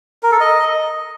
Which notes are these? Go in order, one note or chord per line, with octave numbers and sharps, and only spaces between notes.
A#4
A4
D#5